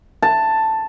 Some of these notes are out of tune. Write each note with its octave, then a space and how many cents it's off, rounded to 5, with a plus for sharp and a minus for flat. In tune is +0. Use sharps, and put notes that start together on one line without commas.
A5 +5